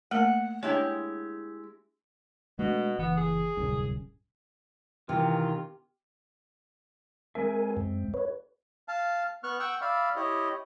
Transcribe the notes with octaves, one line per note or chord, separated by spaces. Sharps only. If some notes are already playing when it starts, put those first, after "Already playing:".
A3 A#3 A#4 F#5
G#3 D4 E4 G4 C#5
B2 G#3 A3 D4
F#1 E3 B3
G#4
D1 C2 F#2
C3 D#3 E3 F4
G#3 C4 A#4 E5 G#5
F#2
B4 C#5
F5 A5
B3 C#6 F6 F#6
F#5 G5 C#6 E6
D5 E5 F5 B5
E4 G4 C#5 D#5